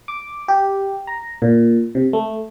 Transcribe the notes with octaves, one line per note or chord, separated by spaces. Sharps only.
D6
G4
A#5
A#2
C3
A3